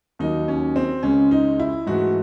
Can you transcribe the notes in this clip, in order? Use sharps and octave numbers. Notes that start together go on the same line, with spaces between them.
D#2 D#3 F#3 D#4
C#4
C4
C#2 C#3 G#3 C#4
D#4
E4
G#2 E3 A3 F#4